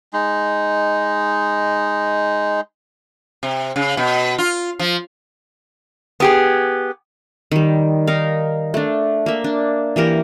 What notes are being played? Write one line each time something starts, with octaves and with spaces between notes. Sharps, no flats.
G#3 D#4
C3
C#3
B2
F4
F3
B3 G4 G#4
D#3 G3
D#4 A#4 F5
A3 D4
A#3 E5
D4
E3 A#3 G4 A#4